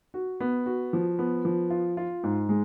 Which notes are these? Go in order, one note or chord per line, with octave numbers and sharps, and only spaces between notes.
F#4
B3
F#4
F3
B3
F3
F4
F4
G#2
G#3